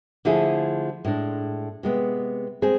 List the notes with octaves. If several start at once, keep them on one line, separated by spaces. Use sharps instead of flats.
D3 F3 A3 E4 G#4
A2 G#3 D4
C3 G#3 B3
G#3 C4 G#4